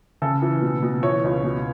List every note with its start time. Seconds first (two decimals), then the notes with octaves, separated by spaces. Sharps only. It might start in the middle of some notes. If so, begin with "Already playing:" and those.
0.22 C#3 A4
0.42 E3
0.62 B2
0.83 B2
1.03 E3 C#5
1.24 C#2
1.44 B2